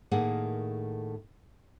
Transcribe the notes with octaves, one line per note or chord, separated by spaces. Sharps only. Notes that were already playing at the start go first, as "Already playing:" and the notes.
A2 D#3 A3 A#3 G#4 F#5